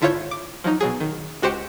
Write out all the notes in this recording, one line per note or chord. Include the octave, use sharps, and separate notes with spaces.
G#1 D3 E4 F4 C#5 G6
D6
F3 F#3 D#4
B2 F#3 G#4
D#3
C#2 F#4 G4 C5 G5 C#7